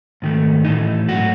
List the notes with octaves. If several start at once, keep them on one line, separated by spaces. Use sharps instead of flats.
G#2 D#3 A3
A2 E3 A3 D#4
G#2 F#3 A3 F#4